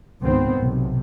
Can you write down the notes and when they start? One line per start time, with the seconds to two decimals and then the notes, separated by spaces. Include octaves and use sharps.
0.22 C#2 G#2 D#3 B3 C4
0.59 B1 C3